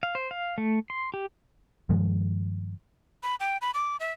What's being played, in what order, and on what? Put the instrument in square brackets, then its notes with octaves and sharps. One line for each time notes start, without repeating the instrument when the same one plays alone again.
[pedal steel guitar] F5
C5
F5
A3
C6
G4
[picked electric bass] G2 D#3 F3 G#3
[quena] B5
G5
B5
D6
E5